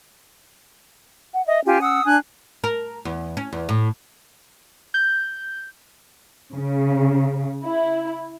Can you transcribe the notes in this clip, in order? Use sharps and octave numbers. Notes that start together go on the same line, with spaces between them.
F#5
D#5 E5
C#4 F4 G4 G#5
F#5 D#6 E6
D4 G#5 F#6
A#4
E2
C#4
E2
A2
G6
C#3
E4